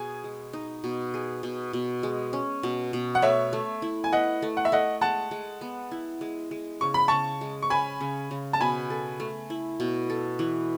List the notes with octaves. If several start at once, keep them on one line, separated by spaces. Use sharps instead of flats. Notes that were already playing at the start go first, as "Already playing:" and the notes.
Already playing: B2 G#4 G#5
G#3
D#4
B2
G#4
B2
B2
G#3
C#4
B2
B2
F#5
A3 C#5 E5
A3
E4
G#5
B4 D#5 F#5
A3
F#5
E5
A3 D#5 F#5
G#3 F#5 A5
G#3
B3
E4
G#3
G#3
C#3 C#6
B5
C#3 A5 C#6
G#3
C#6
C#4 G#5 B5
C#3
C#3
A5
B2 G#5 B5
A4
A3
E4
B2
A4
E3